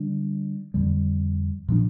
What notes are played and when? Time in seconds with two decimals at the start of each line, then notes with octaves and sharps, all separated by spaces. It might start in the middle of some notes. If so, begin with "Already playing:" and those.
Already playing: D3 G3 D4
0.74 F2 D3 G3
1.69 A#2 F3 D4